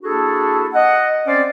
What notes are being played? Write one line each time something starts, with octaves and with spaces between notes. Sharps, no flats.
A#3 D4 E4 F#4 G#4 A4
D#5 F#5
C4 C#4 C5 D5